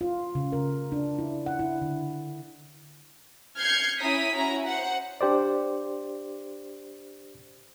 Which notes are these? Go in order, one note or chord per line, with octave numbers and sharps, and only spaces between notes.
F4
C#3
A#4
D4
E4
F#5
E4
D3
F6 G6 G#6 C7 C#7
C#4 E4 A#5 D#6 B6
C#4 E4 F#4 A#5
C5 F#5
D4 G4 C5 D5